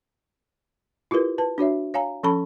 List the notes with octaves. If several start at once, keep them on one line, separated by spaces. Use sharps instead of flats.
E4 F4 G4 A#4 B4
B4 A5
D4 F#4 C#5 E5
C#5 F5 G#5 A#5
F3 C#4 A4 A5 B5 C#6